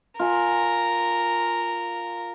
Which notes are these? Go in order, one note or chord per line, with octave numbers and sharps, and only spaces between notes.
F4 A#4 G#5